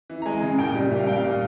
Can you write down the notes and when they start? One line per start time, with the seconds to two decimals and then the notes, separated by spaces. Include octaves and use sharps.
0.10 E3
0.22 A#5
0.26 G#3 G#5
0.42 C#3
0.59 A#2 G5
0.74 G3
0.91 A#2 E5
0.99 F5
1.07 G3 G5
1.16 F5
1.24 A#2